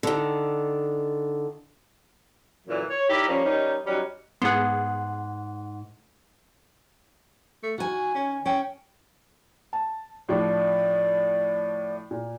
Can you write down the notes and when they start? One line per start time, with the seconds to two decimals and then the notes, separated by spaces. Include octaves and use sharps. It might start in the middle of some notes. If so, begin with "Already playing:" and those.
0.03 D3 D#3
2.67 F#2 A#2 D3 E3
2.90 C#5
3.09 D#4 E4 G4 A#4 D5
3.28 F3 G3 A#3 C#4
3.44 D#3 G3 C#4 D#4
3.86 F#3 G3 C#4 D#4 F#4
4.42 G#2 B3 G#4 F#5 C6
7.63 A3
7.78 D#3 F#4 G#5
8.15 C#4
8.46 C#4 G5
9.73 A5
10.29 A2 F3 D4 D5
12.11 A#2